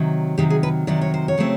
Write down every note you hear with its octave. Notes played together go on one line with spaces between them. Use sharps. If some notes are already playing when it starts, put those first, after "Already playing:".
Already playing: C3 D#3 F#3
C3 D#3 F#3 G4
G#4
B4
C3 D#3 F#3 D5
C#5
C5
C#5
C#3 F#3 A3 C4